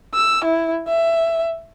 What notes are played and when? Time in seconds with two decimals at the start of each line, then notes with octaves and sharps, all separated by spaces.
0.14 E6
0.44 E4
0.88 E5